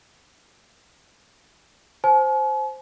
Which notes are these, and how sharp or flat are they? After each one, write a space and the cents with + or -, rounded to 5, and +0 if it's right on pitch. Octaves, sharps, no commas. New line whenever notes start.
C5 +0 G#5 +45